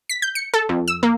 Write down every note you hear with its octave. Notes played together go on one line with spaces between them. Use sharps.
B6
G6
C#7
A4
F2
E6
A#3